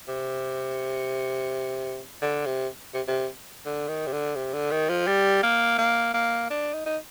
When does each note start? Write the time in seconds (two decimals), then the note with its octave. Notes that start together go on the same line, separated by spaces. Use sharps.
0.08 C3
2.22 D3
2.46 C3
2.94 C3
3.08 C3
3.65 D3
3.88 D#3
4.07 C3
4.12 D3
4.36 C3
4.53 D3
4.71 D#3
4.89 F3
5.07 G3
5.43 A#3
5.78 A#3
6.14 A#3
6.50 D4
6.73 D#4
6.86 D#4